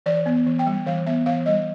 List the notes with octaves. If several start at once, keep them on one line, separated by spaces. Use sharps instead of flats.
E3 D5
B3
E3
G5
G3
E3 F5
B3 E5
E3 F5
G3 D#5